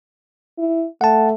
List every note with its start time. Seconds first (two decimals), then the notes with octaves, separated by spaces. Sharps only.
0.58 E4
1.01 A3 F#5 A5